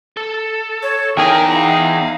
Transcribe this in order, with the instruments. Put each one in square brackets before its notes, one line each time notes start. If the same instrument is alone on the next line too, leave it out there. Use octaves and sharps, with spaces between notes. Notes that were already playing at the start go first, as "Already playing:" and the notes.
[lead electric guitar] A4
[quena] C#5
[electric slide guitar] E2 G#4 G#5 [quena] D#4 [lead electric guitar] A#4 [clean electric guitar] G5
[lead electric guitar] F5 F#5